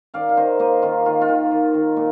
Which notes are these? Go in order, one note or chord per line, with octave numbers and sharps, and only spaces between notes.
D#3 D5 F5
F5
D#3 C5 D#5
A#3 C5 D#5
D#3 F4
D#3 F4
F4
D#3
D#3
D#3
A#2